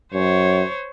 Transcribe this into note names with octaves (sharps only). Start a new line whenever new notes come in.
F#2 C5 C#5